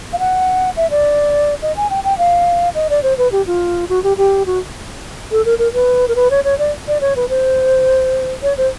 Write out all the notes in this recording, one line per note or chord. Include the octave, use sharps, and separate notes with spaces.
F5
F#5
E5
D5
D#5
G#5
G5
G5
F5
D#5
D5
C5
B4
G4
F4
F#4
G4
G4
F#4
A4
A#4
A#4
B4
A#4
B4
C#5
C#5
D5
D5
C#5
B4
C5
C#5
C5